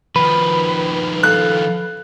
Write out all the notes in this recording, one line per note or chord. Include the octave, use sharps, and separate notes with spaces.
D#3 F3 B4
A4 F5 F#6